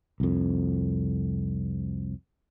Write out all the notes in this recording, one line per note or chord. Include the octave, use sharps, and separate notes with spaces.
C2 F2